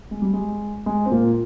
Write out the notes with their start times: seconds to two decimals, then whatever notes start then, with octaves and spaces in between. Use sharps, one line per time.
0.11 G#3
0.22 G3
0.34 G#3
0.86 G#3
1.06 C4
1.11 A#2 A#3